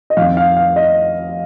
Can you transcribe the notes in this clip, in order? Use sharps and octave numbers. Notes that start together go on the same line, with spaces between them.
D#5
F2 D#3 C4 F5
F5
F5
D#5